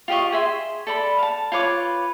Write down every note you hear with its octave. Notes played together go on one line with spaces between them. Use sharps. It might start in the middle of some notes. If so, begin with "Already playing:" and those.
F4 G4 D#5 C#6
G#4 E5 C6
A4 D5 B5
F5 A5
F4 B4 C#5 D6